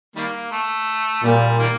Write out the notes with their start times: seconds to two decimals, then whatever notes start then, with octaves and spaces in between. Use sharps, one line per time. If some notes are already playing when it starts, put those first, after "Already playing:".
0.16 D#3 G3 A#3
0.51 A3
1.23 A#2 G3
1.59 D#3 G3 A#3